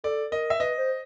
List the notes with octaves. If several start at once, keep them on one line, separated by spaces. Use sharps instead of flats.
A4 D5
A#4 D#5
E5
B4 D#5
C5